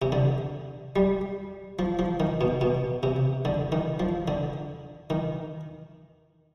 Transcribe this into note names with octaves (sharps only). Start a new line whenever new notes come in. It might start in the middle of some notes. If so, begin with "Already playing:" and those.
C3
D3
G3
F3
F3
D#3
B2
B2
C3
D3
D#3
F3
D3
D#3